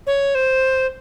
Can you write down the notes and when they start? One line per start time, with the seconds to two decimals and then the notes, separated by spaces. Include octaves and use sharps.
0.07 C#5
0.35 C5